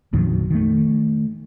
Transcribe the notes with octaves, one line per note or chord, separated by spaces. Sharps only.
A#1 F2 D#3 F#3
D#3 A3